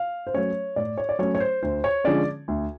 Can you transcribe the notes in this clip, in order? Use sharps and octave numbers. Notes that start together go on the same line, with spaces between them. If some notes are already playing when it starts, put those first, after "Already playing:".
Already playing: F5
C5
F#3 A3 C#4 C#5
A2 D5
C#5
D5
F#3 A3 C#4 C#5
C#5
C5
D2 C5
C#5
D3 F3 G#3 C#4 D5
D2